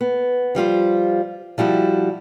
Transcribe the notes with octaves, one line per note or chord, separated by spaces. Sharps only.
B3
F3 G3 F4 C5
F3 G3 E4 F#4